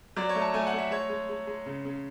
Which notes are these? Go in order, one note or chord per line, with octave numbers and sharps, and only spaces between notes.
F#3 D5
C#5
A3
A5
A3 G#5
F#5
A3
E5
G#3 C#5
G#3
G#3
G#3
C#3
C#3